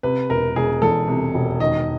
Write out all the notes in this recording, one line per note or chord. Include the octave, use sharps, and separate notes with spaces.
C3 B4
E1 A#4
E1 G#4
E2 A4
C3
E1
D#3 D#5